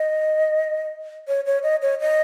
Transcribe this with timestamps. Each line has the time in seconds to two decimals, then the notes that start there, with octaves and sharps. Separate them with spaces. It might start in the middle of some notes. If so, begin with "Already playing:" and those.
Already playing: D#5
1.28 C#5
1.46 C#5
1.63 D#5
1.82 C#5
2.00 D#5